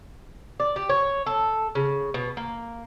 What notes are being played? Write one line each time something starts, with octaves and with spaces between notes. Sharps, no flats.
D5
G4
C#5
A4
C#3
B2
A#3